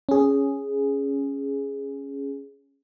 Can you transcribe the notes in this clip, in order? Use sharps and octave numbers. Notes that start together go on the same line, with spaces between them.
C#4 G#4